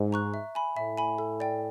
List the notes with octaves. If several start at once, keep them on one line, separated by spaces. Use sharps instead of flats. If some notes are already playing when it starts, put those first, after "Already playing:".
Already playing: G#2
A#5 C#6 F#6
E5
G#5 B5
A2 E5
G#5 B5
A4
D5 G5